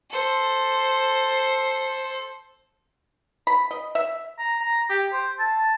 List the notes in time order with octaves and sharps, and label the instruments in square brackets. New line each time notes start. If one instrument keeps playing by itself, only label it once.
[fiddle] A4 C5
[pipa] B5
D#5
E5
[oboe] A#5
A#5
G4
C5
A5